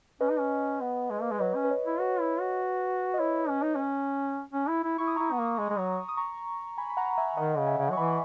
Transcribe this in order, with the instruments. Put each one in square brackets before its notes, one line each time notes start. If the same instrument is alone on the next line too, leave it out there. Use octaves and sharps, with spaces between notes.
[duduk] C#4 [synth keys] B4 D#5
[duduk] D#4
C#4
B3
G#3
A#3
G#3
[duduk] F#3 [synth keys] B4 D#5
[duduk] C#4
[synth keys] B4
C#5
[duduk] E4
[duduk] F#4 [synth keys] B4
[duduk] E4
F#4
[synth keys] D#5
[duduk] E4 [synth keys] C#5
[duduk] C#4
D#4
C#4
C#4
E4
E4
[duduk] E4 [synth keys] C#6
[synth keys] D#6
[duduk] E4 [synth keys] A#5 C#6
[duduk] B3
A#3
G#3
G#3
F#3
[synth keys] D#6
A#5 C#6
G#5 B5
B5
F#5 A#5
E5 G#5
[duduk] D#3 [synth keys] D#5 F#5
[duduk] C#3
[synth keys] E5 G#5
[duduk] C#3
F#3
[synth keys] C#6
[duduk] E3 [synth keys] G#5 B5